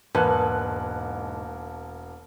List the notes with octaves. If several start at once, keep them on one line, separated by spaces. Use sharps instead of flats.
E1 G#2 A#3 B4 A5 F#6